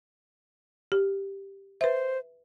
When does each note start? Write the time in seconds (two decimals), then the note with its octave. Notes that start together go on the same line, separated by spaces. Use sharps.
0.92 G4
1.81 B4 C5 E5